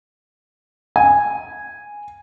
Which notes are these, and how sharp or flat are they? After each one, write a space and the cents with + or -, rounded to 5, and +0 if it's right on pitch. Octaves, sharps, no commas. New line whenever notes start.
G#5 -5